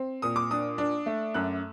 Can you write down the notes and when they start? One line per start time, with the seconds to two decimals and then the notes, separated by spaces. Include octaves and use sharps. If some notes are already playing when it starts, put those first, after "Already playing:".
Already playing: C4
0.22 A#2 D#6
0.36 D6
0.51 D4 D#6
0.78 D4
1.06 A3
1.34 F#2 F#6